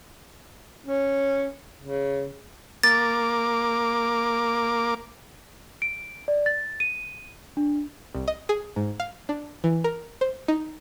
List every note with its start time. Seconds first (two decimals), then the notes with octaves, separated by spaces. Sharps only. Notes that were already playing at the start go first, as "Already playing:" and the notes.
0.86 C#4
1.82 C#3
2.83 A#3 D6 A6
5.82 D7
6.28 D5
6.46 A6
6.80 D#7
7.57 D4
8.15 C2
8.28 D#5
8.49 G#4
8.76 G#2
9.00 F5
9.29 D4
9.64 E3
9.84 A#4
10.21 C5
10.48 D#4